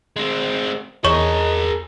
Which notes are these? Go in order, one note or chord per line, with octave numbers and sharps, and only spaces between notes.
G#3 C4
E2 G#4 A#4 C#5 D#5 C#6 E7